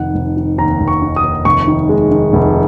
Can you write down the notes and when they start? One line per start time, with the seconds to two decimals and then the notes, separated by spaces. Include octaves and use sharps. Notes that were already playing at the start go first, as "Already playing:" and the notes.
Already playing: F1 D#3 F#5
0.14 F1
0.37 D#3
0.58 D#2 A#5
0.81 F1
0.88 C#6
1.02 D#3
1.16 D#6
1.24 D#2
1.45 F1 C#6
1.68 D#3
1.89 G#3
2.11 D#3
2.33 F1